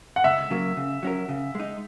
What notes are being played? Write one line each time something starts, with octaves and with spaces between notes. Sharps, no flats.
F#5
C#2 E5
C#3 F#3 A#3
C#3
F#3 C#4 F#4 A#4
C#3
G#3 D#4